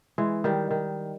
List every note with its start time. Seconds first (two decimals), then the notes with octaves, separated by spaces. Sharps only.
0.18 E3 G#3
0.44 D#3 G3
0.71 D#3